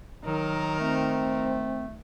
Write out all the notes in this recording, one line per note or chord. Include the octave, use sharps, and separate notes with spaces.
D#3 F#3 A#4
A3 C4